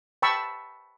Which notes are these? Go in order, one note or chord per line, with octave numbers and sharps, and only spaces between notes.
G5 A5 B5 C#6 E6